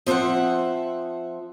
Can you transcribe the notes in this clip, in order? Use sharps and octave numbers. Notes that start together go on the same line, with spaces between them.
F3 C4 A4 E5 F#5